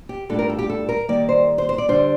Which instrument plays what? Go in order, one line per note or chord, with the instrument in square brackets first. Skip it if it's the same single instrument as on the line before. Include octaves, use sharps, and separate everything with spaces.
[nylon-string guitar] G4
A2 G3 D4 F4 A4
A#4
A4
G4
A4
A#4
D#3 G3 A#3 D#4 D5
C5
C5
C5
D5
D3 G3 D4 C5